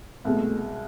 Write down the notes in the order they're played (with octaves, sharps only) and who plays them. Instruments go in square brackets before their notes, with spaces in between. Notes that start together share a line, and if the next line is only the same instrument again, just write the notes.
[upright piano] C2 B2 G#3 [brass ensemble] A3